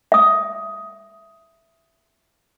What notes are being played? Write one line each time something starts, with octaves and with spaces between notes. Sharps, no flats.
E5 D#6